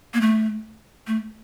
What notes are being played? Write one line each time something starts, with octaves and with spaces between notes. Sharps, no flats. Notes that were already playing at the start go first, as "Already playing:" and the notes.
A#3
A3
A3